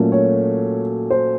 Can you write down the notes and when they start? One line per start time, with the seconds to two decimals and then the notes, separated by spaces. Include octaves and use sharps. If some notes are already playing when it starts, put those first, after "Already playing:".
Already playing: A#2 F#3 A3 C#4
0.12 C#5
1.10 C5